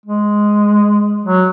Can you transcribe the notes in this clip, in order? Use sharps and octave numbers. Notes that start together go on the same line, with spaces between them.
G#3
F#3